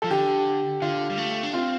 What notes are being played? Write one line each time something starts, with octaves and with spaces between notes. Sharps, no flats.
F3 A4
D3 G4
D3 F4
G3
A3
D4
C4 F4